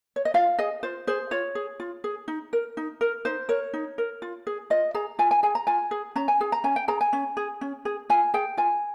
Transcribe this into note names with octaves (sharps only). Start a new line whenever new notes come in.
C#5
D#5
F4 F5
G#4 D#5
F4 C5
G#4 C5
F4 C#5
G#4
F4
G#4
D#4
A#4
D#4
A#4
D#4 C5
A#4 C#5
D#4
A#4
F4
G#4
F4 D#5
G#4 A#5
F4 G#5
G#5
G#4 G#5
A#5
F4 G#5
G#4
C#4 A#5
G#5
G#4
A#5
C#4 G#5
G5
G#4 A#5
G#5
C#4
G#4
C#4
G#4
F4 G#5
G#4 G5
F4 G#5